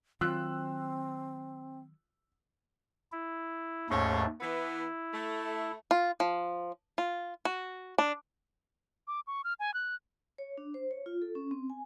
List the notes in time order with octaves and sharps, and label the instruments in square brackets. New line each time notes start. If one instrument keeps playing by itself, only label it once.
[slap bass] D#3 F#3 [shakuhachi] C4 [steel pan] F4 [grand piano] E6 F#6
[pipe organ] E4
[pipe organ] D#2 G#2 A3 [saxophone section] C#3 G#3 C#4
[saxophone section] E3 B3 [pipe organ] E4
[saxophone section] A3
[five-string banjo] F4
F3
F4
F#4
D4
[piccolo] D6
C#6
F6
G#5
F#6
[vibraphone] C#5
D4
C5
C#5
F4
A4
C#4
C4
G#5